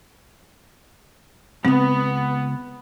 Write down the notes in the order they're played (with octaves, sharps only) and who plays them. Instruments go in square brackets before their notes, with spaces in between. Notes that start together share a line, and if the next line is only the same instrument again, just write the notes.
[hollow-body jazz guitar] C#2 G2 [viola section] B3 [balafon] C4